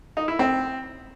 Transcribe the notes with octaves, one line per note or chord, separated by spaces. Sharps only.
D#4
E4
C4